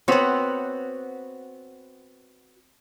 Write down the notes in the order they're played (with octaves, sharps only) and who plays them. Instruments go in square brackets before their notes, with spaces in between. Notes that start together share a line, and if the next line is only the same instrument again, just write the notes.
[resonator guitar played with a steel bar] B3 F#4 C#5 [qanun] C4 B4